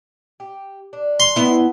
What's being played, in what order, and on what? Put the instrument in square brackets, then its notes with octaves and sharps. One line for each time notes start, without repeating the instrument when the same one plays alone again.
[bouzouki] G4
D4
[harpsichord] C6
[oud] B3 E4